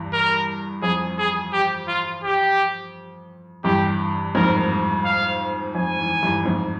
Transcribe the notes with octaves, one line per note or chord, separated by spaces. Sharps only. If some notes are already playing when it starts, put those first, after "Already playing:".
Already playing: E2 G2
A#4
F2 G#4
G#4
G4
F4
G4
E2 G2 G4
F2 G#2 A#4
F5
F2 G#5
E2
E2 G2
F2 G#2